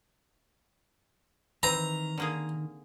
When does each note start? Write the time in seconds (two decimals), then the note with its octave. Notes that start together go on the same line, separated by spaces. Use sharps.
1.63 D#3 E3 C4 A#5
2.18 D3 A#3 G#4